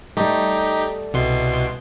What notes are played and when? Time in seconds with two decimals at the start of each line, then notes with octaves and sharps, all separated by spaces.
0.17 G3 A3 D#4 G4
1.14 C2 B2 C6